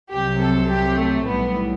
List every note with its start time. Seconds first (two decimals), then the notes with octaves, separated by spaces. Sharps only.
0.11 C2 C3 F#3 G4
0.40 A4
0.69 G4
0.98 A3
1.27 B1 A2 E3 G3 B3